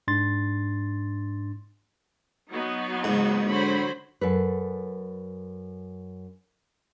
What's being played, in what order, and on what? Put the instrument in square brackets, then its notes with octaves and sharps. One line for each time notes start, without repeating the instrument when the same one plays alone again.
[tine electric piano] G#2 D4 C6 A6
[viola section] F#3 B3 D#4
[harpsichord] G#2 [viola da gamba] C#3 F#4
[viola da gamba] D3 C#5 [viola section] F#3 C5 B5
[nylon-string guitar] F#2 A4 B4